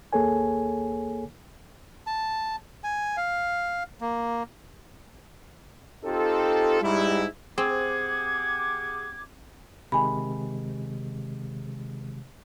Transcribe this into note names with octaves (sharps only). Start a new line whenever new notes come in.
D#2 A#3 G#4 A4 C#5 G#5
A5
G#5
F5
A#3
C4 D#4 F4 G4 A4
G#2 G3 E4
C4 G4 G#4 F#5 D6 G#6
C3 D#3 G#3 G#5 B5